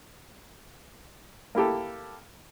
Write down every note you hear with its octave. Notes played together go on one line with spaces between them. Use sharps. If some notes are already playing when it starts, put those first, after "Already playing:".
A#3 E4 G4 A4